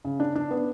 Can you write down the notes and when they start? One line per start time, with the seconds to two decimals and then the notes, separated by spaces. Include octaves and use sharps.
0.05 C#3
0.20 D4
0.35 D4
0.51 B3